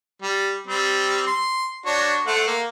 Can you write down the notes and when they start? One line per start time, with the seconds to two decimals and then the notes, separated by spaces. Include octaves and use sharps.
0.22 G3
0.67 G3 C4
1.27 C6
1.86 D4 F#4 C#5
2.27 A3 C5 F#5
2.47 A#3